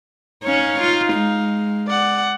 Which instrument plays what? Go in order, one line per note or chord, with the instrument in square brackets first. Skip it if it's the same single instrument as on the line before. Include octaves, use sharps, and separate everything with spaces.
[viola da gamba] C#4 C#5 [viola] D#4 F5
[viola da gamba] F4
G#3
[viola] D5 F#5